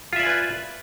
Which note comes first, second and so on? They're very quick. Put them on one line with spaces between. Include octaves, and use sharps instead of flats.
F4 E5 D5 G#5 B4